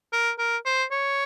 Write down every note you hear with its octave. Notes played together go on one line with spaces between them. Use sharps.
A#4
A#4
C5
C#5